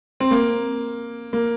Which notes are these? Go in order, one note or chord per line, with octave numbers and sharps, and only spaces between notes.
C4
A#3
A#3